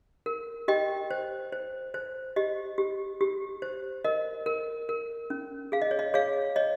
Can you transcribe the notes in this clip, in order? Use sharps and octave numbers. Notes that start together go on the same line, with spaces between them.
A#4
G4 D#5 G5
C5
C5
C5
G4 D#5
G4
G4
C5
A#4 D#5
A#4
A#4
C#4
G#4 F5
D#5
C#5
D#5
G#4 C#5 F5
C#5 D#5